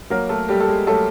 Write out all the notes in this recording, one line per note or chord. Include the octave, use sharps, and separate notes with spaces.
F#3 A#3 A#4
A3 A4
G3 A3 G4
A4
G#3 G#4
F#3 A3 A4